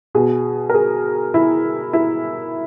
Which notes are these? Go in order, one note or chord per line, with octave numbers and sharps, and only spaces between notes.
B2 G#4
A#4
G#4
E4
E4